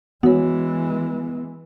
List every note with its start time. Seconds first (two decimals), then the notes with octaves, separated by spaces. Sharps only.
0.23 E3 G#3 B3 F#4 C#5